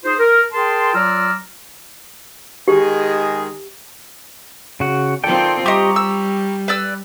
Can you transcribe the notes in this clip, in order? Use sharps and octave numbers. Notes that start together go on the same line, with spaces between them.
D#4 F4 G#4 C5
A#4
G#4 A#4 G5 A5 C6
F#3 F4 D5 A#5 E6 F6
D#3 G#3 G4 G#4
C#3 F#4
D#3 C4 F4 A4 D5 G5
G3 G4 D#5 A#5 C#6 D6
E6
B4 D5 E6